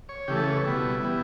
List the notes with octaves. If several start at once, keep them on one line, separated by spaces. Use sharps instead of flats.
C#5
C#3 E3 A3 G4
A4
C#5
B4
B2 G3 B3 E4
E3 G3 B3